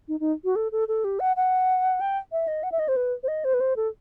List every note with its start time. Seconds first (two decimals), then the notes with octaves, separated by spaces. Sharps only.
0.08 D#4
0.20 D#4
0.45 F#4
0.56 A4
0.72 A4
0.88 A4
1.04 G4
1.20 F#5
1.36 F#5
2.01 G5
2.32 E5
2.47 D#5
2.63 F#5
2.72 E5
2.79 D#5
2.88 C5
2.96 B4
3.23 C5
3.28 D#5
3.44 C5
3.54 B4
3.60 C5
3.76 A4